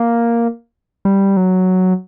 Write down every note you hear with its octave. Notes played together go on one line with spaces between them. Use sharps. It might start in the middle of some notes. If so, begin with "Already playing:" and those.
Already playing: A#3
G3
F#3